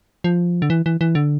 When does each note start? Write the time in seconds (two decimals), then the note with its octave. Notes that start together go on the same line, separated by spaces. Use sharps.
0.24 F3
0.62 D3
0.70 E3
0.86 E3
1.01 E3
1.15 D3